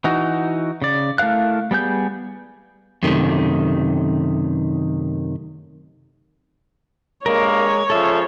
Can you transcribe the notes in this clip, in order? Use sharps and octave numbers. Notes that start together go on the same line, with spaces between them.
E3 D#4 F#4
C#3 D5
A3 E4 A#4 F5 F#6
G3 B3 G#4 G6
F#2 C3 D#3 A3
G2 G#3 A#3 A#4 C#5
C#3 F3 A4 E5